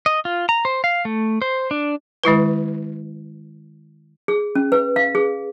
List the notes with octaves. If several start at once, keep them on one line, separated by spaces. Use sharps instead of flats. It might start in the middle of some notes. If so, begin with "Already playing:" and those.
D#5
F4
A#5
C5
F5
A3
C5
D4
D#3 G#3 E4 B4
G#4
C#4
B4
F5
G#4